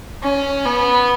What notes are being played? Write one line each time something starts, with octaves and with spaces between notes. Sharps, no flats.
C#4
B3